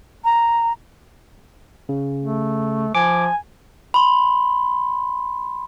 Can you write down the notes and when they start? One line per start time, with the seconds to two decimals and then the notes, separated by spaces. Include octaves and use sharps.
0.24 A#5
1.89 C#3
2.23 A3
2.95 F3 G#5 D6
3.94 B5 C6